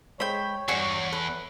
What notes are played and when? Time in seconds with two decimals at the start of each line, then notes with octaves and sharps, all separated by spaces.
0.20 G#3 C5 C#5 G5 B5
0.68 E2 G2 F#4 D5 G#5 C#6
1.12 A4 B4